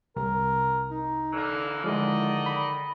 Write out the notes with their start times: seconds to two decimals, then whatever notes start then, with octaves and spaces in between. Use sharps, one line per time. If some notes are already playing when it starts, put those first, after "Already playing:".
0.16 C2 A#4
0.91 D#4
1.33 D3 E3 A#3
1.84 D3 D#3 F3 G#3 E4 D5 D#5
2.46 B5